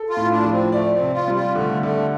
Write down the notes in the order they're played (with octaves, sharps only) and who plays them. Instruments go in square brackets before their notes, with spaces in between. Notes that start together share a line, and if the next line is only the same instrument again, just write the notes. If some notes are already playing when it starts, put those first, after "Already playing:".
Already playing: [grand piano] A4
[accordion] F4
[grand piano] A2
[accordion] D4
[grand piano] F3
[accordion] C4
[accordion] A3 [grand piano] D5
[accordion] C4
[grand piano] C3
[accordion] F4
[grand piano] G3
[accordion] F4
[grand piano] D3 [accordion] A3
[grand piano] D3 [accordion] A3